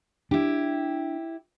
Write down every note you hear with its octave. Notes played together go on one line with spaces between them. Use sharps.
D4 E4 G4